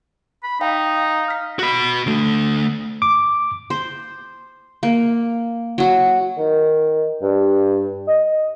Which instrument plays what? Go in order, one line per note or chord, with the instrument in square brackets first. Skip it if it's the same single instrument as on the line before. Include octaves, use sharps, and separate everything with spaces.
[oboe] B5
[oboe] D#4 [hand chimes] F5 G5
[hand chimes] F6 B6
[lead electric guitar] F#4 B5
D3 A3
[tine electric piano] D6
[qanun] C5
A#3
F#3 F#4
[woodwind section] D#3
G2
D#5